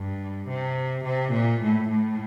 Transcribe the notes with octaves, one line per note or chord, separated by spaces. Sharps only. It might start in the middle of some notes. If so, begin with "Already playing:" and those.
Already playing: G2
C3
C3
A#2
A2
A2